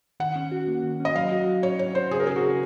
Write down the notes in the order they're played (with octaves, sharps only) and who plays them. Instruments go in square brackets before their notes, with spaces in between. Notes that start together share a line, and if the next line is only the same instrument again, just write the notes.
[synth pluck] D#3 [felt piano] F#5
[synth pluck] C#4
F#4
A#3
D#3
C#4
[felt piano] D#5
[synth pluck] F#3 [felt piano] F5
[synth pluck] F#4
F#3
[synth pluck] C#4 [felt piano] C#5
[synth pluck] F#3 [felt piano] C#5
[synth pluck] F#4 [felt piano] C5
[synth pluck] C#3 [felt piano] G#4
[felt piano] A#4
[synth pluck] C#4 [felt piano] G#4
[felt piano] F#4
[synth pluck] C#3